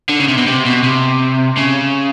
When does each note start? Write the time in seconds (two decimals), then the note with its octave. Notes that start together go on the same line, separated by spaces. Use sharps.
0.10 D3
0.20 C#3
0.28 C3
0.38 B2
0.47 C3
0.66 B2
0.84 C3
1.58 C#3